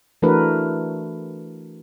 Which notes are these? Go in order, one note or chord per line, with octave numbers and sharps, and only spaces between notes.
E3 A3 D4 F#4 A#4 B4